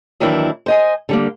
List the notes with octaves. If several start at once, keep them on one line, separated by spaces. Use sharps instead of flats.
D#2 D#3 E3 F#3 D4 E4
C5 D#5 G#5
D3 G3 A#3